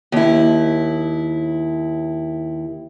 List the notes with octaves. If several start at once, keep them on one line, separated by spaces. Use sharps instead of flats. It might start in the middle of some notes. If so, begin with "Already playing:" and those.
D#2 E4